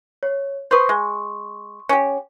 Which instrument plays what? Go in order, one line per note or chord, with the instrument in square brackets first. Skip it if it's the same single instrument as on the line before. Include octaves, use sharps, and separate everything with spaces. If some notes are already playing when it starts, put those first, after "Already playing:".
[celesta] C#5
[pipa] B4 C5 [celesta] C6 C#6 D#6
[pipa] G#3
C#4 G4